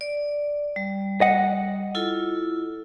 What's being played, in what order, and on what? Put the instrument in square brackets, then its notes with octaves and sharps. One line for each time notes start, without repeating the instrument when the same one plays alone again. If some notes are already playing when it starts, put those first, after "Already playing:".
[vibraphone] D5
G3
[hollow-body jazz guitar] D#5 F#5
[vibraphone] E4 F4 A4